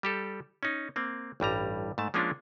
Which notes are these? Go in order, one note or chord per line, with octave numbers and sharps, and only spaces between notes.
G3 G4 A4
C#4 D#4
A#3 C4
A1 G2 G3 A#5
G#2 A3 A5
F3 G#3 A#3 C#4 D4 F4